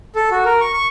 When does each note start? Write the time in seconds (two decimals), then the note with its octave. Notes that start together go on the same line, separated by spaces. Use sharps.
0.15 A4
0.31 F#4
0.45 A#4
0.61 C#6
0.73 C#6